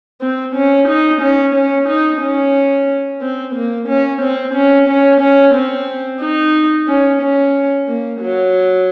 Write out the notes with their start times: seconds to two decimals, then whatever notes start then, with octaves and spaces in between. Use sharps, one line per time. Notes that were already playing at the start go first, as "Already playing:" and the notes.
0.21 C4
0.56 C#4
0.88 D#4
1.22 C#4
1.55 C#4
1.89 D#4
2.22 C#4
3.21 C4
3.55 A#3
3.89 C#4
4.22 C4
4.54 C#4
4.88 C#4
5.20 C#4
5.54 C4
6.21 D#4
6.88 C#4
7.21 C#4
7.88 A#3
8.21 F#3